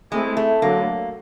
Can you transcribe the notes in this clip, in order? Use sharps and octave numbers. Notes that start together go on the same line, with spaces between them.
G#3 A3 C4 E4 G#4
A3
D3 F#3 A3 A#3